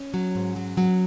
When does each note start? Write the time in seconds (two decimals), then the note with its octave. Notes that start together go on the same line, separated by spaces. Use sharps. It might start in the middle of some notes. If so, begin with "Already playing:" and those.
Already playing: C#4
0.14 F#3
0.35 G#2
0.56 F#3
0.77 F#3